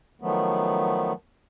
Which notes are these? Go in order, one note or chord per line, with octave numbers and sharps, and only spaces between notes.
D#3 F3 F#3 A3 B3